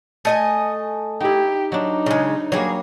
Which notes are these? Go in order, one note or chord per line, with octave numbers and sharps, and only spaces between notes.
A3 D#5 G#5
D#4 E4 G4
F#3 D4 D#4
C#3 G#3
F#3 G3 A#3 G#4 C#5